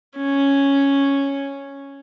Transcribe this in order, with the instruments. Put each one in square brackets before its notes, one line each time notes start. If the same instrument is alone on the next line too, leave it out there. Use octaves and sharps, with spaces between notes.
[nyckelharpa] C#4